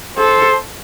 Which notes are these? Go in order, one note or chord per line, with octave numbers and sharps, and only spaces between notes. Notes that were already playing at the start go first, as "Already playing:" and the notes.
A4 C5